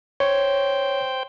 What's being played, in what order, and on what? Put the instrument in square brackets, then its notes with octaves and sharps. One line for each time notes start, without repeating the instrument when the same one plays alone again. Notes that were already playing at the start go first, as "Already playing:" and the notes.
[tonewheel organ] C5 G5 G6 [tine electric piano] C#5